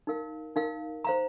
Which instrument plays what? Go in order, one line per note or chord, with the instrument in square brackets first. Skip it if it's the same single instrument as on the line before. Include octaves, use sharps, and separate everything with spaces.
[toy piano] D#4 A#4 F5
D#4 A#4 F5
C5 F5 A#5